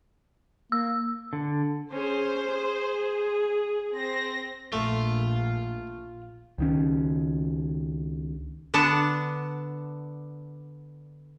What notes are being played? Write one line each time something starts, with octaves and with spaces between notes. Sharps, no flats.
A#3 E6
D3
C#4 G#4 C5
G#4
C4 C5 A#6
A#1 A3 F4
C#2 D#3 C#4
D3 B3 D4 A5